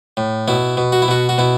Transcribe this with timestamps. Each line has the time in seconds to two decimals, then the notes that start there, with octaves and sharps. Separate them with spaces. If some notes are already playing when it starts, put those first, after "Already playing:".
0.17 A2
0.48 B2 E4
0.77 B2
0.92 F#4
1.02 E4
1.08 B2 F#4
1.29 F#4
1.38 B2 E4